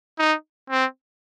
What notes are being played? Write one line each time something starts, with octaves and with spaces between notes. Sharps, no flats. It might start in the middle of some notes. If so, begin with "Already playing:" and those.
D#4
C4